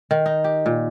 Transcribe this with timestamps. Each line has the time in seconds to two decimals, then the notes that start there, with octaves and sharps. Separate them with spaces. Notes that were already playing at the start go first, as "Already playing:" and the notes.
0.11 D#3
0.26 D#4
0.44 G4
0.66 A#2